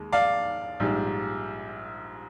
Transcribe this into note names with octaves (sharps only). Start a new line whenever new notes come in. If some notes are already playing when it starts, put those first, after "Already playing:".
Already playing: D#2 G#3
D5 F5
A#1 G#2 G3